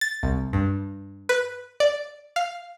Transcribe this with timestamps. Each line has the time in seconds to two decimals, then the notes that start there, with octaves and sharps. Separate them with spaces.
0.01 A6
0.23 C2
0.53 G2
1.29 B4
1.80 D5
2.36 F5